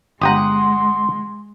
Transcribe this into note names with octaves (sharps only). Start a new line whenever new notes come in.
G1 G#3 G4 F#5 A#5 C6 D#6